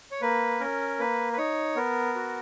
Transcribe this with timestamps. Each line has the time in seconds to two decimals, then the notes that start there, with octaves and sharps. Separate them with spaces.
0.11 C#5
0.22 A#3 B4
0.60 C#4 A#4
0.99 A#3 B4
1.33 B4
1.38 D#4 C#5
1.76 B3 A#4
2.15 F#4